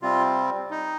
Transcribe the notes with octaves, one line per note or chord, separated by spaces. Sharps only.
C3 G3 C4 F4
D#4